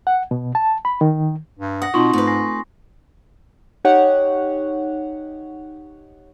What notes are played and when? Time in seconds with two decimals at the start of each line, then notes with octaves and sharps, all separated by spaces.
0.07 F#5
0.31 B2
0.55 A5
0.85 B5
1.01 D#3
1.58 G2
1.82 F#5 D#6 A#6
1.94 B2 C4 D#4 F4 C6 C#6
2.13 G#2 A3 B4
2.27 G#5 A#6 C7
3.85 D#4 G4 C#5 F#5